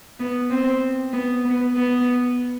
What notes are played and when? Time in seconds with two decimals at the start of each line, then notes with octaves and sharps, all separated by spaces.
0.20 B3
0.50 C4
1.13 B3
1.45 B3
1.76 B3